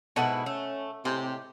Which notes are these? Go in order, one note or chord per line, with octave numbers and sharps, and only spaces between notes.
G#2 B2 E4 A4 B4 D#5 F#5
A3 C#4
A2 C3 G#3 G4 C5